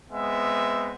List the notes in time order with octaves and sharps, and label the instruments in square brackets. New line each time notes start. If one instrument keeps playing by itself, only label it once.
[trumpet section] G#3 B3 C4 E5